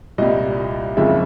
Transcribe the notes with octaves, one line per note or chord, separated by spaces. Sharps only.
C2 A#2 G3 D#5
F#1 F2 C#3 F3 G#3 E5